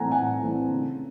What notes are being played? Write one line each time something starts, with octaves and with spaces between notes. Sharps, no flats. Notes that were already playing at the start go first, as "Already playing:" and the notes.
Already playing: A2 E3 A3 C4 F#5 G#5 A#5
A2 F#5 G#5
E3 A3 C4
C#3